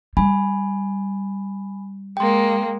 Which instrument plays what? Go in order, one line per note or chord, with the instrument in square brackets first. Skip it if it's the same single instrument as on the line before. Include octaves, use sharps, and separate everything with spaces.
[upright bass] G3 [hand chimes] G#5 B5
[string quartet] G#3 A#3 [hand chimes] G5 C6